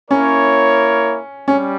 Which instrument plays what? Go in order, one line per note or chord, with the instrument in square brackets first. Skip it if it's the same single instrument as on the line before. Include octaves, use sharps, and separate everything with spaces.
[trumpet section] A#3 E4 A#4 C#5 [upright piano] C#4
[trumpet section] G3 [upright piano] C#4